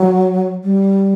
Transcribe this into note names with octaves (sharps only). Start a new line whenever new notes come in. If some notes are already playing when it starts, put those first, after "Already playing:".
Already playing: F#3
G3